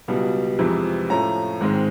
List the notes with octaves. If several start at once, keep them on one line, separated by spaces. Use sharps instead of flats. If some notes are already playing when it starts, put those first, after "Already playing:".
C#2 B2 G3
F2 C3 E3 G#3
A2 F3 A3 C#4 A#5
G#2 D#3 G#3 C4